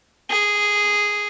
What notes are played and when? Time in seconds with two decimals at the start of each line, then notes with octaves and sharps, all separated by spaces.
0.30 G#4